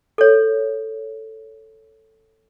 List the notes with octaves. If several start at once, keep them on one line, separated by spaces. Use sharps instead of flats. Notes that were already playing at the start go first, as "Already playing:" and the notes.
A4 C#5